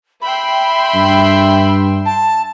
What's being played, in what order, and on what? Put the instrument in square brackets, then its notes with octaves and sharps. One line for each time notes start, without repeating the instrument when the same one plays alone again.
[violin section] E5 G5 C6 [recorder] B5
[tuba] G2
[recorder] A5